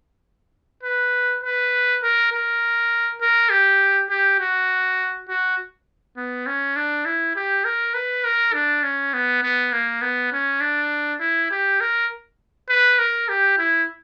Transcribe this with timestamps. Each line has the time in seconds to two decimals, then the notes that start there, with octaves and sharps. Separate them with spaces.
0.83 B4
1.43 B4
2.03 A#4
2.32 A#4
3.21 A#4
3.50 G4
4.09 G4
4.40 F#4
5.28 F#4
6.17 B3
6.46 C#4
6.76 D4
7.05 E4
7.36 G4
7.65 A#4
7.94 B4
8.24 A#4
8.53 D4
8.83 C#4
9.13 B3
9.43 B3
9.73 A#3
10.01 B3
10.32 C#4
10.61 D4
11.20 E4
11.51 G4
11.80 A#4
12.69 B4
12.99 A#4
13.29 G4
13.58 E4